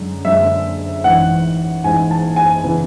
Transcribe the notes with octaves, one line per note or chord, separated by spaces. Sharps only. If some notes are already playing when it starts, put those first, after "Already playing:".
Already playing: F#2 D3 G#3 D4
F#2 D3 G#3 D4 E5
A1 G#2 E3 F#5
A1 G#2 E3 G#5
A5
G#5
C#3 E3 B3 D4